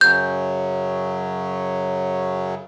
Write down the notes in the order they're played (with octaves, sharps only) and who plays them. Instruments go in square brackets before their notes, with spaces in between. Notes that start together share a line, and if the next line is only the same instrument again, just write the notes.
[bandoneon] F#2 C#3 F#3 [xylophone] G6